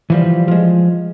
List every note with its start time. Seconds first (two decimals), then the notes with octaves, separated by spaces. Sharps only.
0.10 E3 F3 G3
0.48 F3 G#3